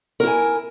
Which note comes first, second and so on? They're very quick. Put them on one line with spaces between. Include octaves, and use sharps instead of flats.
A#4 E4 G#5